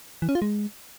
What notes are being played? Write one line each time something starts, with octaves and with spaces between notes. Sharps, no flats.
E3
C#4
F4
G#3